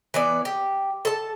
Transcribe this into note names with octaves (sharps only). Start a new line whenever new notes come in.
E3 B3 D5
G4
A4 A5